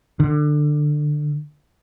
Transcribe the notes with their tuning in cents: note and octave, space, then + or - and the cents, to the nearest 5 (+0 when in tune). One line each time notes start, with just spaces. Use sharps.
D3 +20